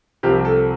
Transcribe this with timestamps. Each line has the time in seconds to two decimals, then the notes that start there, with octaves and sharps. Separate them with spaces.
0.23 C2 C3 F3 C4 G4
0.45 A4